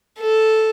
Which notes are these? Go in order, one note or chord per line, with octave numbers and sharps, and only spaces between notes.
A4